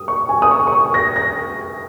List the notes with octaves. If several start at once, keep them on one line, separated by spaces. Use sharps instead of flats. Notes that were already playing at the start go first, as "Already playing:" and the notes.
Already playing: D#6
C#6
G#5
D#6
C#6
C#6
D#6
A#6
A#6